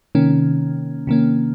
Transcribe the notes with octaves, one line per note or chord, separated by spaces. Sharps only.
C3 D#3 A#3 C#4
C3 D#3 A#3 C#4